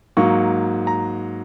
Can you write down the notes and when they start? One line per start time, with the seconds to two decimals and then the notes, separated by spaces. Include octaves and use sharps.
0.17 G#2 F#3 A#3 C#6
0.87 A#5